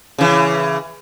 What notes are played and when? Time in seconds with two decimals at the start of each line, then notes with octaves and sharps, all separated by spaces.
0.18 C#3 E3